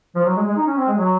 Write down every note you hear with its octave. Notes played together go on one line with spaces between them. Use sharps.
F3
F#3
G#3
G#3
D#4
C#4
C4
G#3
F#3